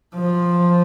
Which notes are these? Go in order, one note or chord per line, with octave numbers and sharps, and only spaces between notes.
F3